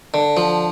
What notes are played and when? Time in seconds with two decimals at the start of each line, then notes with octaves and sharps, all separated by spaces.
0.14 D3
0.37 F3